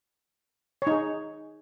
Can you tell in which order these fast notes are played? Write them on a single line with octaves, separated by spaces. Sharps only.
C#5 D#4 G#4